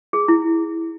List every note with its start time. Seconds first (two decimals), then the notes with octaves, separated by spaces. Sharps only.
0.13 G#4
0.28 E4